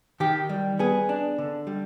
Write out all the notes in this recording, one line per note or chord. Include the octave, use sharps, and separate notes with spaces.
D#3 G4
G3
B3 G#4
D4
D3
G3